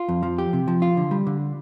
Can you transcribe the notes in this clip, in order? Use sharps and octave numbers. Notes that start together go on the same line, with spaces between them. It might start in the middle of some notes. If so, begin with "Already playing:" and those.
Already playing: F4
F2
F3
G4
C3
F3
F4
D3
G3
D3